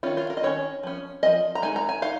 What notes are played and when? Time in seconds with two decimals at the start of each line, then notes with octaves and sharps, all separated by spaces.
0.03 D#3 C#4 F4
0.17 F4
0.30 A#4
0.37 D#5
0.43 D#3 C#4 C#5
0.83 F3 C#4
1.23 F3 C#4 D#5
1.55 A#5
1.62 G#3 D#4 G#5
1.76 A#5
1.89 G#5
2.02 D#4 F5